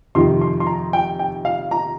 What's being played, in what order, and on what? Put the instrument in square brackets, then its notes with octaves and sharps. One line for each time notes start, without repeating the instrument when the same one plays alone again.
[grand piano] F2 C3 D#3 C6
C6
C6
A#5
G5
G5
F5
A#5